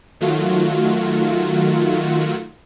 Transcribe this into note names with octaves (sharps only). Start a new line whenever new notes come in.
D#3 F#3 A3 F4 F#4